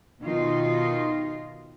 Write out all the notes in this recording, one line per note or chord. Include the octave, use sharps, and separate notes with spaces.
B2 D#3 D#4 F4